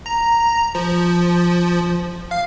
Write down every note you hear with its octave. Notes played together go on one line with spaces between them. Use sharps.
A#5
F3
F5